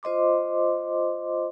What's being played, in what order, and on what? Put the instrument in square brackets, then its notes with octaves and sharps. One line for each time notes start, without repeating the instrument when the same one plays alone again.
[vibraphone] F4 C5 D#5 C6 D6